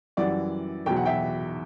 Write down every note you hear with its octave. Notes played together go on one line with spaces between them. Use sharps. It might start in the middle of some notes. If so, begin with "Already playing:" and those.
F#2 E3 G3 D5 F#5
E2 B2 F#3 G5
F#5
E5 G5